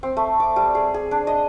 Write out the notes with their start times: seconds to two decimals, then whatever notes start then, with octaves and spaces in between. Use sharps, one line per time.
0.03 C4
0.17 A3
0.40 D6
0.56 G3
0.75 G#4
0.94 G#4
1.11 D4
1.27 D#5